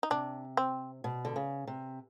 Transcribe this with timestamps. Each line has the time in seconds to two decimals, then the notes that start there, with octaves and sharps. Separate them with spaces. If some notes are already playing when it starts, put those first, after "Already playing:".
0.03 D#4
0.10 C3 D4
0.57 C4
1.04 B2
1.25 D3
1.36 C#3
1.67 C3